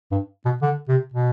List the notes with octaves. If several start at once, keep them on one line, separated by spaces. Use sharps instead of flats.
G2
B2
D3
C3
B2